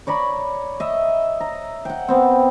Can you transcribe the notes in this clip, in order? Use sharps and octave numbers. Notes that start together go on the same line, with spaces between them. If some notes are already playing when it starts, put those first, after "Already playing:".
C#5 D5 A#5 B5
D#5 E5
A#5
F#5 G5
B3 C4